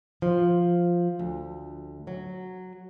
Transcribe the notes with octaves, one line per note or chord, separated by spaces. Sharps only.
F3
D2
F#3